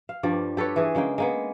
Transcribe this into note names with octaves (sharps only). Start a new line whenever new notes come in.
F5
G2 F3 G3 D5
G4 A4 B4 C#5
E3 G#4
C#3 G#3 A#3 G5
G#3 A#3 B3